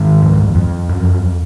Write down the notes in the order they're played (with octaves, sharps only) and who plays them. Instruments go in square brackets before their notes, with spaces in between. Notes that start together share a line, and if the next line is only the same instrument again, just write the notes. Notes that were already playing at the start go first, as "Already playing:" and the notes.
Already playing: [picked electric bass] G#2 D#3
F2
F2
F#2